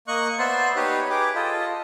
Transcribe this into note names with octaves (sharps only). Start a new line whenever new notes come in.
A#3 D#5 C#6 F#6
B3 C5 D5 E5 C6
D#4 G4 B4 C#5
G4 G#4 B4 G5 D6
F4 A4 D#5